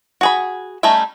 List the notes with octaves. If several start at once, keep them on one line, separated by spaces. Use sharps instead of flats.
F#4 G#4 B5
G3 A3 C#4 D#4 E5